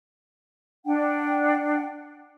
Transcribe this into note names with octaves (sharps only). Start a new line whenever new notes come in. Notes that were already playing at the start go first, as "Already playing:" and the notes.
D4 F#5 G5